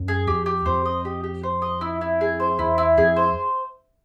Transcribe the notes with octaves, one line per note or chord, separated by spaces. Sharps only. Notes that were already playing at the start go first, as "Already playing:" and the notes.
Already playing: F#2
G#4
F2 G4
G4
F2 C5
D#5
G4
G4
C5
D#5
E4
E4
G#4
C5
E2 E4
E4
F2 G#4
C5